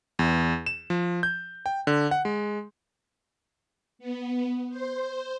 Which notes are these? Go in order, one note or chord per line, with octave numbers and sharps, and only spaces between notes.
E2
E7
F3
G6
G5
D3
F#5
G#3
B3
C5